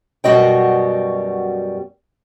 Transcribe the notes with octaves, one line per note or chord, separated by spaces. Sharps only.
F#2 B2 G3 F#4 D#5 G5